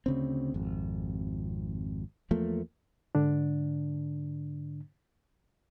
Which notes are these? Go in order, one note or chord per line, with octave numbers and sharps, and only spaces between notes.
D2 C#3 C4
G#1 F2
E2 F3 A3 A#3
G#2 D3 D4